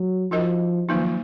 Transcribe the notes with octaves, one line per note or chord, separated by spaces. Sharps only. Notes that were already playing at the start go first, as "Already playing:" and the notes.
Already playing: F#3
F3 D#4 F#4 A#4 D#5
D#3 F3 F#3 A#3 D#4